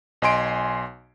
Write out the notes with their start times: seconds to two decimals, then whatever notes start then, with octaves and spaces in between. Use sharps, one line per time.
0.22 B1 D#5 G#5 C6 D7